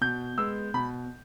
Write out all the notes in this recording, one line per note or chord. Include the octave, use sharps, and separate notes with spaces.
B2 G6
G#3 B3 E6
B2 B5